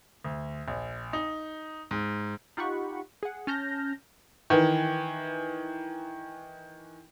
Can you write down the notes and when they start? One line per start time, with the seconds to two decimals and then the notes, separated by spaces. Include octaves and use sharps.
0.24 D2
0.68 A#1
1.13 D#4
1.91 G#2
2.57 D#4 F4 G4 F#5 B5 C#6
3.23 G#4 F#5
3.47 C#4 A5 F6 G6 A#6
4.50 D#3 E3